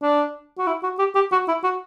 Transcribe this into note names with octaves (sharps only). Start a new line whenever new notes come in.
D4
F#4
E4
F#4
G4
G4
F#4
E4
F#4